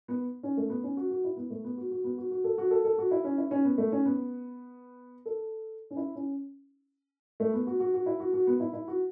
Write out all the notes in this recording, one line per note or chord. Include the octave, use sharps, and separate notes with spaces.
B3
C#4
A3
B3
C#4
F#4
F#4
E4
B3
A3
B3
F#4
F#4
B3
F#4
F#4
A4
F#4
A4
A4
F#4
E4
C#4
E4
C#4
B3
A3
C#4
B3
A4
C#4
E4
C#4
A3
B3
F#4
F#4
F#4
E4
F#4
F#4
B3
E4
E4
F#4